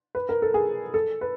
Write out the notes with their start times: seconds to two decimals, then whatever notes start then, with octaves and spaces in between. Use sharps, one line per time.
0.15 B4
0.29 A#4
0.42 A4
0.54 G#4
0.94 A4
1.21 B4